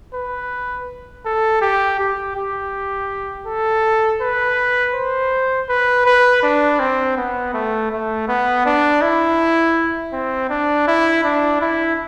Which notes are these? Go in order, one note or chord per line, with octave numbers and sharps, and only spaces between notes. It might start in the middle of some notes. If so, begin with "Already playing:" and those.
B4
A4
G4
G4
G4
A4
B4
C5
B4
B4
D4
C4
B3
A3
A3
B3
D4
E4
C4
D4
E4
D4
E4